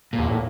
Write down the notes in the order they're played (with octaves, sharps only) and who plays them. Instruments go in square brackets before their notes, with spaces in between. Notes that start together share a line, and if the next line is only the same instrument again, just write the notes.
[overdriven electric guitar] A#2
[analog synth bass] E2
A2